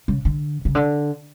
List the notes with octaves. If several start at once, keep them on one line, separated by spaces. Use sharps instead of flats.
C#3
D3
C#3
D3